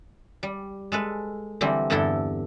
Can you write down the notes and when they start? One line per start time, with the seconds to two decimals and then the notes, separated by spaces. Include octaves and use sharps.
0.43 G3
0.92 G#3 A4 B4
1.61 D3 E3 G3 C4
1.90 E2 G2 D3 E4 A4 G5